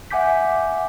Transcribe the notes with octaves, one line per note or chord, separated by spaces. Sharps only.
E5 F#5 G#5 D6 G6 B6